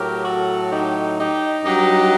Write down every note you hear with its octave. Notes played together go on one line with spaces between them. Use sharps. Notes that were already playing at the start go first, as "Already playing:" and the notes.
Already playing: A2 F#3 G4 A#4
F#4 A4
D#4 G4
D#4 G4
G2 F#3 D#4 G4